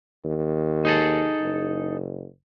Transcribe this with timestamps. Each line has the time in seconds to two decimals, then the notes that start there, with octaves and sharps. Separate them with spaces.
0.25 D#2
0.85 D#4 G#4 A4
1.41 F#1